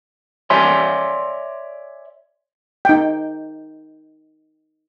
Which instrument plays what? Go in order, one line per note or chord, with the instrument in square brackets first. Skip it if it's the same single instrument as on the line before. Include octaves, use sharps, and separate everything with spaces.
[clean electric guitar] C#5 D5 E5 G#5 C6
[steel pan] D#4 G5